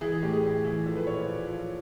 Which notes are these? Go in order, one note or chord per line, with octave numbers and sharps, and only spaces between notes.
E3 G#4
G#4
A2 G4
G#4
A2
E3
F3 A4
B4
A#2 C#5
D5
A#2 D5
F3